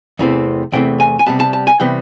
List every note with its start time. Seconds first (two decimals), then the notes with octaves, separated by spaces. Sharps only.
0.19 E2 C3 E3 A3 C4
0.72 E2 C3 E3 A3 C4 G5
1.00 G#5
1.19 G#5
1.26 C3 E3 G3 B3 A5
1.40 A5
1.53 A5
1.67 G#5
1.80 C3 E3 G3 B3 G5